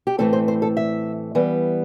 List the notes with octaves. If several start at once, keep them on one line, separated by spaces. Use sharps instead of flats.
G4
A2 E3 A3 C4 A4
C5
C5
A4
E5
E3 G3 B3